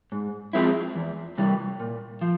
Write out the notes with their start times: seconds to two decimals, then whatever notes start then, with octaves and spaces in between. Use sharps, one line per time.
0.12 G#2
0.53 F3 G#3 C4 E4
0.96 E2
1.38 C3 E3 G3
1.80 A#2
2.21 F3